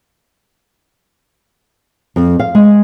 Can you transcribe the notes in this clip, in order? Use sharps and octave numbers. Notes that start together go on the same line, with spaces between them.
F2
F5
G#3